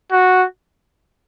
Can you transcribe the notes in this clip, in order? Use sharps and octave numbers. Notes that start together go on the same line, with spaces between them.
F#4